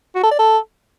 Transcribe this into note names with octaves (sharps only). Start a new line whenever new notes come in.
F#4
A4
D5
A4